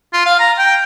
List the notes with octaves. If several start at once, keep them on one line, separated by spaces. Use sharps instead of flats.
F4
F5
A#5
G5